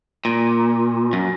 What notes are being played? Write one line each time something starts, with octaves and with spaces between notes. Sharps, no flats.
A#2
F#2